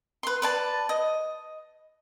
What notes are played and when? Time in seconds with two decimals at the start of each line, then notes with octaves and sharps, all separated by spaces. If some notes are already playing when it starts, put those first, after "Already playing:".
0.23 B4 C6
0.42 B4 D5 A5
0.89 D#5